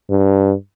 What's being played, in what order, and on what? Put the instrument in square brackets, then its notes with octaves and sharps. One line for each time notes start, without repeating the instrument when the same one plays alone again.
[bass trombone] G2